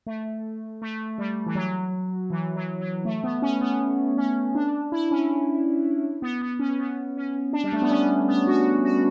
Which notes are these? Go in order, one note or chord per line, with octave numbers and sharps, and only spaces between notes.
A3
A3
G3
E3
F#3
E3
F#3
F#3
A3
B3
C#4
B3
C#4
D4
E4
C#4
B3
B3
C#4
B3
C#4
D4
G3
A3
B3
C#4
B3
F#4
F#4